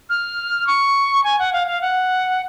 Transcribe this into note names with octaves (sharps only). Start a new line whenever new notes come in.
F6
C#6
G#5
F#5
F5
F5
F#5